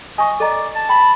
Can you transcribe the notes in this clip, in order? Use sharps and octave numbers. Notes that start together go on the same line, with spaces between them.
D#5 G#5 C#6
A4 D5 D#5 A#5
A5
G5 B5